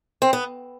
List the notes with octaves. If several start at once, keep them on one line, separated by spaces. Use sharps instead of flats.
C4
B3